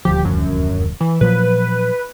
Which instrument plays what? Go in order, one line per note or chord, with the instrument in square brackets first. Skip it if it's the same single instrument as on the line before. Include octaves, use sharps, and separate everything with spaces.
[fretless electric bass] D#1 D2 F3 [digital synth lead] G4
[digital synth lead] F#2
E3
[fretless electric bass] A#2 F3 F#3 [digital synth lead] B4